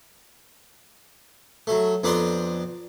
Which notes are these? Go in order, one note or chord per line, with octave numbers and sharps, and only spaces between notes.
F#3 A3
F2 B3 D4 D5 A#5 C6